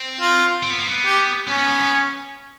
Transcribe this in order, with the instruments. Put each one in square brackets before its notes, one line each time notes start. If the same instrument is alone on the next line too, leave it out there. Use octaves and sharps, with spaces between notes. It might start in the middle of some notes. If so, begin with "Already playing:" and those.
Already playing: [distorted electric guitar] C4
[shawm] F4
[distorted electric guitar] C4
B3
A#3
B3
[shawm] G4
[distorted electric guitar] B3 [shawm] C#4
[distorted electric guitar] B3
B3
B3